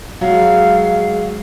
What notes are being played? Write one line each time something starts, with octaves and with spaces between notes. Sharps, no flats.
F#3 G#3 F5